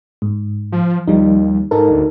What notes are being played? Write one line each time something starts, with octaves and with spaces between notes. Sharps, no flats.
G#2
F3
D#2 F3 G3 D#4
G#2 D#4 A4 A#4
D2